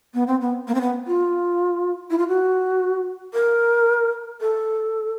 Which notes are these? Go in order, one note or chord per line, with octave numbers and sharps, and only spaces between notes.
B3
C4
B3
A#3
C4
B3
F4
E4
F4
F#4
A#4
A4